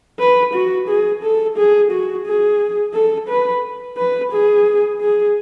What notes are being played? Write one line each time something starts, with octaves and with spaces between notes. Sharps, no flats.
B4
F#4
G#4
A4
G#4
F#4
G#4
A4
B4
B4
G#4
G#4